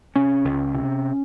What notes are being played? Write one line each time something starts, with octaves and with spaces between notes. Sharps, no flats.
C3 C#4
C#2
C3